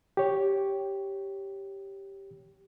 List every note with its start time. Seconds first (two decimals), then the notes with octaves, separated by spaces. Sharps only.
0.17 G4 C#5